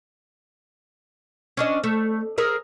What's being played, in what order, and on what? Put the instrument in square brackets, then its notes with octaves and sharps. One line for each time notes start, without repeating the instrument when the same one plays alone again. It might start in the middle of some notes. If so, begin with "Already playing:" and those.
[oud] C#4 D4 D#5
A3
G#4 A#4 E5